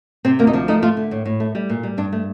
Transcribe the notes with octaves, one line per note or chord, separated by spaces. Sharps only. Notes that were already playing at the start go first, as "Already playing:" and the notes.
C3 C4
D2 A#3
D#4
F3 D4
A3 D#4
A3 F4
D3
A2
A2
A3
G3
A#2
G3
G2 D4
A3